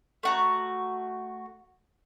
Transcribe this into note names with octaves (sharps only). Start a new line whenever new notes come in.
A3 F#4 A#5